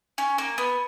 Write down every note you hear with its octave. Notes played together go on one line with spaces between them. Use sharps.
C#4
A#3
B3